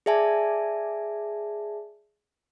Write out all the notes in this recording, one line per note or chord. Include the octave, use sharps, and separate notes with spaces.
G#4 D5 E5 G#5 A5